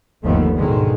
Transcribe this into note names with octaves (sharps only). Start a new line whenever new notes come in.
G1 D#2 D#3 F3 A3 B3
G#2 B2 D3 D#3 G#3